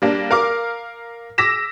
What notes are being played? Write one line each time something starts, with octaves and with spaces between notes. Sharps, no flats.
G3 A#3 D4
A#4 F5 D6 F6
D6 E6 A#6 B6 E7